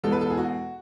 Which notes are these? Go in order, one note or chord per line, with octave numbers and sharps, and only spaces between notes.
E2 B2 G#3 B3 A4
B4
A4
G#4
F#4